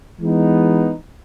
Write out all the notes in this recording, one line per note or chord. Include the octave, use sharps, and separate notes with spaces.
E3 G#3 B3 D#4